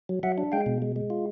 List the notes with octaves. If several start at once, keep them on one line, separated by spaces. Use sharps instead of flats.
F#3
F#3 E5 F#5
D4
G#3 F5 G5
B2
G#3
G#3
F4